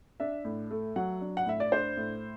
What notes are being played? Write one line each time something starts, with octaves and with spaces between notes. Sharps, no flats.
D4 E5
A2
A3
F#3 F#5
D4
F#5
A2 E5
D5
D4 C5
A2